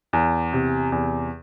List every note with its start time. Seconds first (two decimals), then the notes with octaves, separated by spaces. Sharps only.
0.13 E2
0.53 C3
0.92 E2